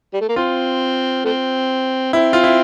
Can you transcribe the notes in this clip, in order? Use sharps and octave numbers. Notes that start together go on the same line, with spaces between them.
G3
A3
A#3
C4 F4
A3 C4
C4 E4
F4
E4